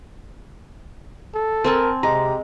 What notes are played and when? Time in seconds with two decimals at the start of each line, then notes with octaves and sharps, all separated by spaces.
1.35 A4
1.64 C4 A#4 G#5 A5
2.03 C3 G#3 G4 A#5